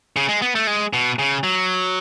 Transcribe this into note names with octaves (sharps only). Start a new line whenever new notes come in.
C#3
G#3
B3
A3
G#3
B2
C#3
F#3